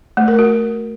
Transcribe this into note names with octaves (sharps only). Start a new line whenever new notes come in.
A3
A#4
F#4